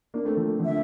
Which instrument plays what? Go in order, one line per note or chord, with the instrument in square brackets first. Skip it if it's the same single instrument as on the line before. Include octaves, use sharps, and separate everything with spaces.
[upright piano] A#3 D4
A3 C4
F3 A3
D3 F3
[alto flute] E5